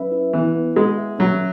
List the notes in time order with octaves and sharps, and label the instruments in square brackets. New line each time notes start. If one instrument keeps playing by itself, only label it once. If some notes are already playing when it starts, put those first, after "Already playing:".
Already playing: [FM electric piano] F#3 C#4 B4 E5
E4
[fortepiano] E3 [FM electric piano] B3
[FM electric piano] B3
[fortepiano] G#3 [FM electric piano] F#4
[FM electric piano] E5
[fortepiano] F#3 [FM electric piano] C#4